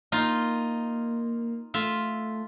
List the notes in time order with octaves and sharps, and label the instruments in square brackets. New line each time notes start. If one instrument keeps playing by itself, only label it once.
[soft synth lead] A#3 [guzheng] D#4 F4
[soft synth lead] A3 [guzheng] F4 E5